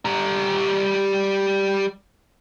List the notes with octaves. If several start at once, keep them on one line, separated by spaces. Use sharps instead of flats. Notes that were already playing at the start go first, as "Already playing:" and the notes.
G3 A#5